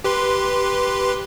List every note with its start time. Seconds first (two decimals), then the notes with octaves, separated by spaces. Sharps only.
0.04 G4 B4 C6